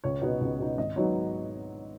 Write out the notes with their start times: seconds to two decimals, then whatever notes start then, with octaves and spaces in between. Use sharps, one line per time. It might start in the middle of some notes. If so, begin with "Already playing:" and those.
0.04 C#2 C#5
0.22 B2 B3 D#4
0.41 C#2
0.59 B2 B3 D#4
0.77 G#1 D#5
0.96 G#2 F#3 B3 D#4 C#5